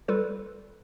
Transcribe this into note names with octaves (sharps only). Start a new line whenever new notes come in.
G3 F4 A4 B4